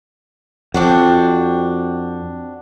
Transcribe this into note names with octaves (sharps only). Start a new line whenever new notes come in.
F2 C4 D4 F#4